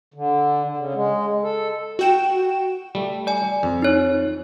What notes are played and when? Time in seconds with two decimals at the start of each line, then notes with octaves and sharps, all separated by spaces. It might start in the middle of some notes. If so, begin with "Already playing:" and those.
0.14 D3
0.77 C#3
0.95 G#3
1.43 A4
1.99 F#4 G5 E7
2.95 G3 A3
3.27 D5 G#5
3.63 F2
3.82 D#4 C#5